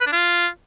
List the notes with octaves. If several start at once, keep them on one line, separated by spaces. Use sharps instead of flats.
B4
D4
F4